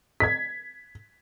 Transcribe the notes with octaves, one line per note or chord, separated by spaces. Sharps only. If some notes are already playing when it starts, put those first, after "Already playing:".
G#6 B6